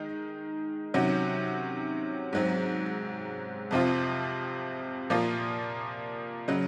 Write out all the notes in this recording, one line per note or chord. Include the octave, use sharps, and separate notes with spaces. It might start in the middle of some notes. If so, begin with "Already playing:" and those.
Already playing: D#3 G#3 D#4
C3 D#3 F#3 C#4 F#4
G#2 F#3 C4
F2 C3 F3 C4 F4
A#2 F3 A#3 F4
C#3 F#3